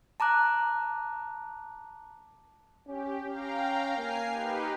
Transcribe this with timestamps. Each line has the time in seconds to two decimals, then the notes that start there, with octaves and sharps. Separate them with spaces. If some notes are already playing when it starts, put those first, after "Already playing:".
0.20 A5 A#5 D6 F#6
2.87 C#4 G4
3.27 C#4 F5 G5 A#5
3.97 A#3 G#5 F6 C7
4.30 D#4 G4 B4